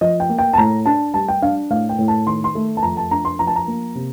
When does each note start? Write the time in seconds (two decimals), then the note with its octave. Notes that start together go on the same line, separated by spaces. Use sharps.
0.01 F3 D#5
0.20 G5
0.30 A#3
0.39 G5
0.53 A5
0.57 A2 A#5
0.86 D4 A5
1.14 G3 A5
1.28 G5
1.42 D4 F5
1.70 A2 F5
1.89 G5
1.99 A2
2.08 A5
2.27 D#3 C6
2.44 C6
2.55 A3
2.77 A5
2.83 F2 A#5
2.97 A5
3.11 D4 A#5
3.25 C6
3.39 F3 A#5
3.47 A5
3.56 A#5
3.68 A#3
3.95 C3